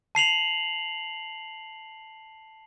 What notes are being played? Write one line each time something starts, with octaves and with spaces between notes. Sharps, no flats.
A5 C7 F7 F#7